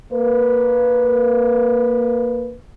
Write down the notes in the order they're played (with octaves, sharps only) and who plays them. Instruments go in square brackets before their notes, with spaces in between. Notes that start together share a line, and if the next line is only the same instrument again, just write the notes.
[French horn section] A#3 B4